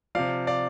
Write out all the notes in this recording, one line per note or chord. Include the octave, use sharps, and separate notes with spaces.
C3 F3 D5 F5
D5 F5